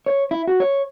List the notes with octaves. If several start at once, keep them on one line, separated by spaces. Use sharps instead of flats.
C#5
E4
F#4
C#5